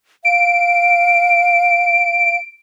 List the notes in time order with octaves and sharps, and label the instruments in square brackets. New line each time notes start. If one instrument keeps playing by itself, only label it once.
[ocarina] F5 [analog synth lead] D7